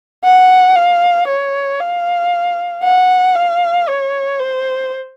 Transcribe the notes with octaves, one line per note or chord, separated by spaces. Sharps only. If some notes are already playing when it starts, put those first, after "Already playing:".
F#5
F5
C#5
F5
F#5
F5
C#5
C5